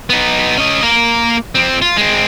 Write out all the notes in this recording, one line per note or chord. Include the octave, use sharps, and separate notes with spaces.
B3 D#4
C#4 D#5
A#3 A#4
F3 C4
F4
G#3 C4